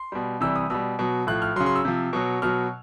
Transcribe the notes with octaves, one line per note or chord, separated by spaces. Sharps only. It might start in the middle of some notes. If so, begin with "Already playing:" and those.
Already playing: C6
B2 G3
C3 E3 G3 E6
D#6
B2 G3 E6
B2 F#3
A2 F3 F#6
F6
C#3 F#3 C6
C6
E6
C3 F3
B2 F#3
B2 F#3 F6